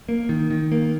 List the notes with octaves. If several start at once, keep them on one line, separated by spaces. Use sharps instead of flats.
A#3
D#3
D#3
A#3